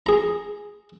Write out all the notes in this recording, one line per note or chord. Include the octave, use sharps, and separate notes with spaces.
G#4 A#5